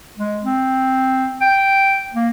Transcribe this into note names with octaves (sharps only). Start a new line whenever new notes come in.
G#3
C4
G5
A#3